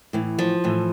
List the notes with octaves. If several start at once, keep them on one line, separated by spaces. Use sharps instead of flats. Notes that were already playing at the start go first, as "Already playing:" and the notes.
A2 E3
F3
A2 E3